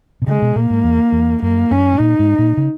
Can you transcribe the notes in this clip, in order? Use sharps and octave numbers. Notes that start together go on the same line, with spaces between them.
B2
C#3 G#3
B2
A#2 A#3
G#2
E2
E2
F#2 A#3
F#2 C#4
G#2
A#2 D#4
G#2
A#2
C#3